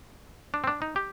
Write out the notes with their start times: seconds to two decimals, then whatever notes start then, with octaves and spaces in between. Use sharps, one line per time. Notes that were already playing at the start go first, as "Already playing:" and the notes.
0.54 D4
0.64 C4
0.67 D4
0.82 D#4
0.96 G4